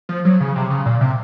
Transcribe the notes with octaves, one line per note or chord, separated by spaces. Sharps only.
F3
F#3
C#3
C3
C#3
A#2
C3